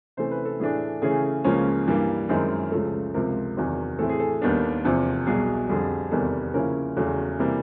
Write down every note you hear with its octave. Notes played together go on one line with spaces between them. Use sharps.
C3 E3 A3 C#4 C5
B4
A4
A2 E3 A3 D4 G#4
C#3 E3 A3 C#4 G#4
C#2 C#3 F3 A#3 C#4
G2 E3 G3 A#3
F#2 D#3 G#3 C4 E4
C#2 C#3 F3 A3 A4
C#2 C3 F3 A#4
E2 C3 D#3 F#3
A2 E3 A3 C4 A4
G#4
A4
D#2 D#3 G3 B3 D4
E2 C3 F3
C2 B2 F#3 G#4
F2 D3 G3 G#4
E2 C3 D#3 G3 B3 A4
C#3 F3 A#3 C#4 E4 A#4
E2 C#3 F#3 A3 A4
C3 E3 G3 A#3